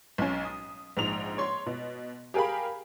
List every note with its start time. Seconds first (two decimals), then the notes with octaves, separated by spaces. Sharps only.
0.18 B1 C#4
0.45 D#6
0.97 A#1 G#2 F7
1.38 C#5 C6
1.66 B2
2.34 G4 G#4 A#4 F5 B5